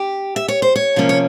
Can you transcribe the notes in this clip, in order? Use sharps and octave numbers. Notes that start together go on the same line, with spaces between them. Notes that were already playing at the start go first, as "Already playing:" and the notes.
Already playing: G4
E5
C#5
C5
C#5
C3 F3 A#3 C#4
C#5